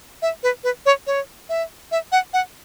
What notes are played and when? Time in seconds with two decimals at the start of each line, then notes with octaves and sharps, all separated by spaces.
0.22 E5
0.43 B4
0.64 B4
0.86 C#5
1.07 C#5
1.49 E5
1.92 E5
2.12 F#5
2.34 F#5